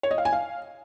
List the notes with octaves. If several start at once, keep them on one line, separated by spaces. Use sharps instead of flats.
C#5
D#5
F5
G#5
F5